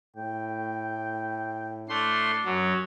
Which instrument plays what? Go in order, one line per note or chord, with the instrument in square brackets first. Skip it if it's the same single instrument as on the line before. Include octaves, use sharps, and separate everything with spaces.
[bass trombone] A2 [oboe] G5
[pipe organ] A3 C6 [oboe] D4
[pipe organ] F#2 F#3